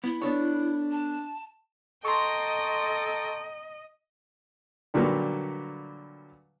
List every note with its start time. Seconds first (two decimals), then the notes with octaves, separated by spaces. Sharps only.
0.04 B3 E4
0.22 B3 D4 A4 C#5
0.91 A5
2.05 A4 D#5 G5 A#5 C6 C#6
4.94 A#2 D3 F#3 G3 A#3 B3